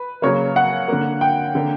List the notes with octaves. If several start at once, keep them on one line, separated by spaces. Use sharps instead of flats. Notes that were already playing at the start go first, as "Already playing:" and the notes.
Already playing: B4
C#3 F#3 A#3 C#5
F#5
D3 A#3
G5
D3 A#3